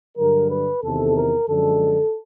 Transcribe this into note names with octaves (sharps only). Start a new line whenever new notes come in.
G2 D3 F#3 A#4
B4
E2 C3 D#3 A4
A#4
F#2 D3 F3 G#3 A4